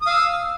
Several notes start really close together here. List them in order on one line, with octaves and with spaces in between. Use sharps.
D#6 F5 E6